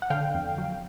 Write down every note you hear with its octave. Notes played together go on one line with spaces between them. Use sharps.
F#5
D3 F5 G5
F2
F#3